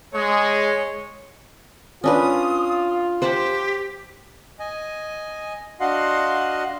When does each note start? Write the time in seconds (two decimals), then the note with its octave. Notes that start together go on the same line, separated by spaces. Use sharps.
0.13 G#3 C#5
2.04 C#4 D4 F4 B4 D#6
3.22 G4 C5 F#5 A5
4.59 D#5 G#5
5.80 D4 F#4 D#5 F5 F#5 C6